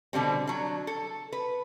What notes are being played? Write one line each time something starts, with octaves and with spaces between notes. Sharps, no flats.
B2 D3 G3 C4
F#3 D4
A4
B4